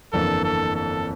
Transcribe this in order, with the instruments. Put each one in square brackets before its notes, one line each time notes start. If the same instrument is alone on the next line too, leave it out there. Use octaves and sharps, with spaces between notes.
[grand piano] G1 F2 E3 A#3 D4 [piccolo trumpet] A4
[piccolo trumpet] A4
A4